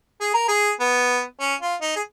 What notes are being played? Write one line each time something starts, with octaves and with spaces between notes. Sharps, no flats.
G#4
A#4
G#4
B3
C#4
F4
D#4
G#4